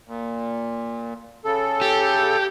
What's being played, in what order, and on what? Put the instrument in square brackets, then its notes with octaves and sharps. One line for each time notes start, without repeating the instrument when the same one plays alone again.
[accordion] A#2
C#3 A4
[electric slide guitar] G4